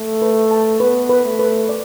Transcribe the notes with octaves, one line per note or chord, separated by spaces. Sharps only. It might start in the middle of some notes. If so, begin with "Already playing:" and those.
Already playing: A3
B4
A5
B3 B4
B4
A3
B4
D5